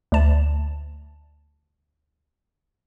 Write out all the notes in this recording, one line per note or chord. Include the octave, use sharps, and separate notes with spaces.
D2 A5